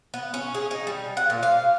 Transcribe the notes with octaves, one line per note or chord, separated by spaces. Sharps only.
B3
C#4
G#4
D#4
G3
F#5
A#2
F5